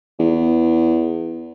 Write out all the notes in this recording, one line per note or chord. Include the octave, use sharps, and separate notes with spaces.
E2